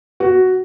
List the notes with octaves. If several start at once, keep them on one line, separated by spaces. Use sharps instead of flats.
F#4